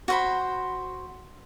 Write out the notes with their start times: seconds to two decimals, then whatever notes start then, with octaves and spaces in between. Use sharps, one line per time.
0.08 F#4 C5 B5